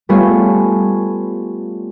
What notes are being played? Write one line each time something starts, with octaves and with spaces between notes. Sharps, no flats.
G3 A3 B3 F4 G#4 C#5